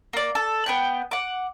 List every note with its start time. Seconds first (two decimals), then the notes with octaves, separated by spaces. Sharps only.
0.13 A#3 D5
0.35 A4
0.66 B3 G5 F#6
1.11 F#5 D6